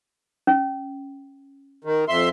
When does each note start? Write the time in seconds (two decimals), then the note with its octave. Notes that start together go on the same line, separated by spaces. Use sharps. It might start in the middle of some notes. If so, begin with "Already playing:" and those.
0.47 C#4
1.84 D#3
2.09 F2 E5 C6